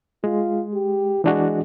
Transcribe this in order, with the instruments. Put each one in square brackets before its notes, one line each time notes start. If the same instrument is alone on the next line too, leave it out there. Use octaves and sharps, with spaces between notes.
[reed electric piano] G#3 [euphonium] F4
[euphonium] G4
[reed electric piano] E3 D4 F#4 [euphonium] G#3